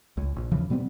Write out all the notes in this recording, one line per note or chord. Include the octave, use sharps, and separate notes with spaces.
C#2
A#1
E2 C#3 E3 F3
B2 G3 B3 C4